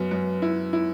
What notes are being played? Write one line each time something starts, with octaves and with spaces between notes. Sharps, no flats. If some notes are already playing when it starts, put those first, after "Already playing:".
Already playing: F#2 B3
F#2
E4
E4